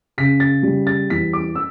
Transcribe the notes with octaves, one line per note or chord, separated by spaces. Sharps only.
C#3 B6
A6
G3
A6
E2 B6
D6
E6